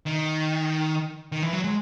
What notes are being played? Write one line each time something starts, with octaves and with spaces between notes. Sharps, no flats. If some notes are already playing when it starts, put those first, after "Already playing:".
D#3
D#3
E3
F#3
G#3